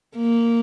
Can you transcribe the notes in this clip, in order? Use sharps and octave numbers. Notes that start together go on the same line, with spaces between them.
A#3